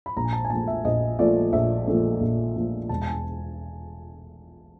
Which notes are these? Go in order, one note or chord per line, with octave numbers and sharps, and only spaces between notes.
B5
A#1 A#5
G#5
A5
G#5
A#2 F3 A3 A5
E5
A#1 D#5
A#2 F3 A3 D5
A#1 E5
A#2 F3 A3
A#1
A#2 F3 A3
E1 A5
A5
G#5